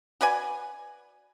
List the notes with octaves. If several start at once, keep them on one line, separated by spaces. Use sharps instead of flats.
F#4 B4 D5 G#5